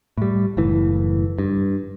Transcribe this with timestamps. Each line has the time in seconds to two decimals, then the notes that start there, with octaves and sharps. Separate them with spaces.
0.18 A2 G3
0.57 F#1 A2 E3
1.39 G2